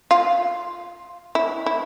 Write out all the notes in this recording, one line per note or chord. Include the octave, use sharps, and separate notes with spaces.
F4
E4
E4